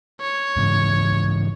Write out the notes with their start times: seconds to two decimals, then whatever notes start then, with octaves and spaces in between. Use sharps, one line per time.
0.21 C#5
0.57 G#2 C#3 E3